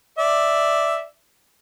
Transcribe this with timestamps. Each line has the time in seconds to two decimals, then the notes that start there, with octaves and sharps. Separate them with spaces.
0.18 D5 E5